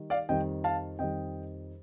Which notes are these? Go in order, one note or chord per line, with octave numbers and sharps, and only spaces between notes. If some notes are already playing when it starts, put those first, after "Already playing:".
Already playing: D#3 G3
D5 F5
F2 D#3 G3 D#5 G5
F5 A5
F2 D#3 G3 D#5 G5